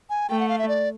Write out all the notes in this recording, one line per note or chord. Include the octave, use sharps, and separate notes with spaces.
G#5
A3 G5
F#5
F5
E5
D5